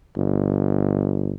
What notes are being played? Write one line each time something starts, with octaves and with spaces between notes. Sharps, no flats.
G1